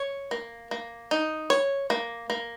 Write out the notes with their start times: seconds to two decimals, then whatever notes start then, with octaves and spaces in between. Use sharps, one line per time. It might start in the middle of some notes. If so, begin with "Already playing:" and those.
Already playing: C#5
0.31 A#3
0.71 A#3
1.11 D#4
1.50 C#5
1.90 A#3
2.30 A#3